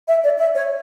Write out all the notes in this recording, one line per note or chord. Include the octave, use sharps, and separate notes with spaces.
E5
D5
E5
C#5